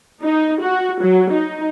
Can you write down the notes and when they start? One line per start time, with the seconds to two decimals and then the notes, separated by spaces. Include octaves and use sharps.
0.22 D#4
0.61 F#4
1.02 F#3
1.32 D#4